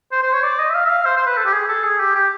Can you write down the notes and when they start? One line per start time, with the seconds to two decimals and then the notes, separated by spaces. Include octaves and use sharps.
0.12 C5
0.23 C5
0.33 C#5
0.43 D5
0.59 D#5
0.70 E5
0.75 F5
0.85 E5
0.90 F5
1.05 C5
1.17 C5
1.26 B4
1.37 A4
1.46 G4
1.53 G#4
1.68 A4
1.84 G#4
2.00 G4
2.15 G4